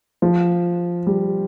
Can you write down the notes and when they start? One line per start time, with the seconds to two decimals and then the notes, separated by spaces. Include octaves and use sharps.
0.22 F3
1.07 G3